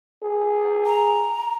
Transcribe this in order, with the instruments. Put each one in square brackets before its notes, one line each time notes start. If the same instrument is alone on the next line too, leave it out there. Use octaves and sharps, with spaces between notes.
[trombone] G#4
[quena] A#5